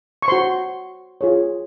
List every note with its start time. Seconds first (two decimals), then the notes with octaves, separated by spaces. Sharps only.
0.22 C#6
0.28 F#4 C5 C6
1.21 F4 G#4 C#5